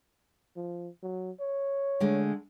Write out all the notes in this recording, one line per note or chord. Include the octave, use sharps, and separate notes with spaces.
F3
F#3
C#5
D3 G#3 A3